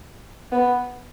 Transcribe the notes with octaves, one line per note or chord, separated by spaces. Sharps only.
B3